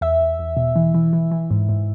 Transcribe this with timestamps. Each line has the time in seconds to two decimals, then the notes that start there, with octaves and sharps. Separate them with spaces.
0.01 E2 E5
0.20 E2
0.39 E2
0.57 B2
0.76 E3
0.94 E3
1.13 E3
1.31 E3
1.51 G#2
1.69 G#2